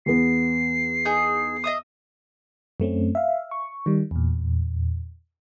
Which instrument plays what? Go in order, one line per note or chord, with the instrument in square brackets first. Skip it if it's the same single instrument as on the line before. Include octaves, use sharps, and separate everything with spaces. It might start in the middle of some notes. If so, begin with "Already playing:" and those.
[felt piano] E2 B3 [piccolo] C7
[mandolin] D#4 G#4
D#5 E5 D#6
[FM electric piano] F#2 A3 C4 C#4
E5 F5
C#6
D#3 G3
E2 A#2